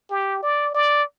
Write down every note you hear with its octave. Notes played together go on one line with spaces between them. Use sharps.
G4
D5
D5